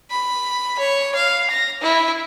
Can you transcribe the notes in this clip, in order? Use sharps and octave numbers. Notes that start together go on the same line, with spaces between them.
B5
C#5
F5
A#6
E4